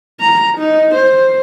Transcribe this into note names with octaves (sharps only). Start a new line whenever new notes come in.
A#5
D#4
C5